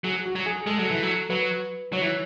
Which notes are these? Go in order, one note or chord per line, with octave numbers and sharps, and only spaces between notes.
F#3 G#4
F#4
F#3
G#4
G#3 A4
F#3
E3
F#3
F#3 B4
F#3 C#5
E3